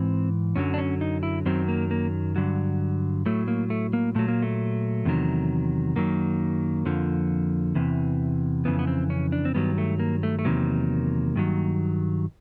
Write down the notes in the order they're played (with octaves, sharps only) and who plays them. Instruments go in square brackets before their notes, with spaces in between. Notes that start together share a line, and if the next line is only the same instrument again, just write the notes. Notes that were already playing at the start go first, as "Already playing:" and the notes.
Already playing: [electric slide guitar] G#2 E3 C4
F#2 D3 F#3 C#4
D4
C#4
D#4
E4
F#2 D#3 F#3 C4
A#3
A#3
G2 D3 F#3
A2 F#3 A3
A#3
A3
A#3
A#2 F#3 A3
A#3
A3
E2 C3 D#3 F#3
F#2 D#3 F#3 A#3
F2 D3 F3
E2 C3 E3
F2 C#3 E3 B3
B3
C4
C#4
D4
C4
G2 D#3 F#3 B3
A3
A#3
A3
A3
E2 C3 D#3 F#3 A#3
G2 D#3 F#3